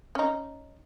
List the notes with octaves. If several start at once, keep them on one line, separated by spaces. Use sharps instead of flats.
C#4 D#4